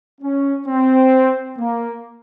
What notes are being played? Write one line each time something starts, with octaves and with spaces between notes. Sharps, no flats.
C#4
C4
A#3